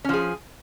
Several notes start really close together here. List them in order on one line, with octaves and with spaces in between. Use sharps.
C#4 F3 G#4